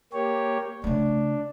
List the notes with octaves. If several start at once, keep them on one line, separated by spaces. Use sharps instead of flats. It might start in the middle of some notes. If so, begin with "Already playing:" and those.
A#3 G4 C#5
C#3 A3 D4